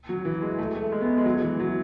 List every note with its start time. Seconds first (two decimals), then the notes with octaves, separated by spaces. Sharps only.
0.09 F#3
0.25 E3
0.42 G#3
0.58 A3
0.75 A3
0.92 G#3
1.01 B3
1.18 G#3
1.25 F#3
1.42 E3
1.60 F#3